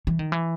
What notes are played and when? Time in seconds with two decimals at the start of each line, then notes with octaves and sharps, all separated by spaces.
0.07 E3
0.19 D#3
0.32 E3